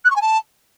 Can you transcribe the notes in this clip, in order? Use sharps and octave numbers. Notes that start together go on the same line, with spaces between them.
F#6
C#6
G#5
A5